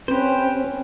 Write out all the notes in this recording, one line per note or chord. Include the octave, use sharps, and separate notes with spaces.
C4 C#4 G4 B4 C5